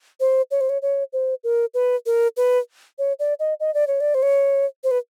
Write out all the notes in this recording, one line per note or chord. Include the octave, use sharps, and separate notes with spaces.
C5
C#5
C5
C#5
C#5
C5
A#4
B4
A#4
B4
C#5
D5
D#5
D#5
D5
C#5
D5
C5
C#5
C5
B4